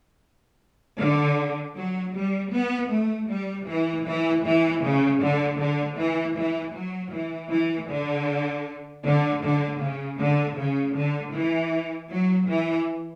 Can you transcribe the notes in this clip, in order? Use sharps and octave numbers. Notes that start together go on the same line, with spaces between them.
D3
F#3
G3
B3
A3
G3
E3
E3
E3
C#3
D3
D3
E3
E3
F#3
E3
E3
D3
D3
D3
C#3
D3
C#3
D3
E3
F#3
E3